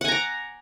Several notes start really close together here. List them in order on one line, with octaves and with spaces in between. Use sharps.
F#5 G#5 A#5 D6